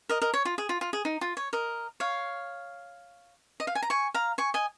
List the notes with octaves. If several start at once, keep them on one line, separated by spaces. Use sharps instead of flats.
A#4 D#5
A#4 D#5
C#5
F4
G#4
F4
F4
G#4
D#4
F4
C#5
A#4 D#5
C#5 F5
D#5
F5
G#5
A#5
G#5 C#6
F5 A#5
G#5 C#6
D#5 G#5